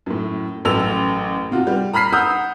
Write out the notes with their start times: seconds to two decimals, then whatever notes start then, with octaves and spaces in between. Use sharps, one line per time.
0.06 F#2 A2
0.65 A1 F#2 A3 E6 F7
1.51 C3 F4 F#4
1.67 G3
1.93 A#5 B5 F6 B6 C7
2.13 F#5 A#5 D#6 E6 G6